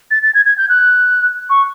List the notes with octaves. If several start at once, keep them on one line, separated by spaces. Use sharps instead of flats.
A6
A6
G#6
G#6
G6
F#6
C#6